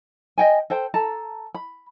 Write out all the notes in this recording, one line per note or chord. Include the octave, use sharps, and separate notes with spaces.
D#5 G5 G#5
A4 C5 G5
A4 A5 A#5
B5